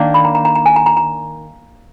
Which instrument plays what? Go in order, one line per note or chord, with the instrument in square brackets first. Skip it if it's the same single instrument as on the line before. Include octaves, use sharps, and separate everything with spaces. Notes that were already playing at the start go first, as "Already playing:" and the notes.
Already playing: [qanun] D#3 A#3 D4
[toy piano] B5
A#5
A#5
A#5
A#5
G#5
A#5
A#5
A#5